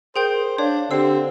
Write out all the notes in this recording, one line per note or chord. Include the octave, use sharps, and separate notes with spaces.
G#4 A#4 C5 G5 G6
D4 C#5 F5
D3 C4 G4 E6 C7